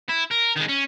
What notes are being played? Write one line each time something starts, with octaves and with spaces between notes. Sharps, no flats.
E4
A#4
D#3 G#3
C#4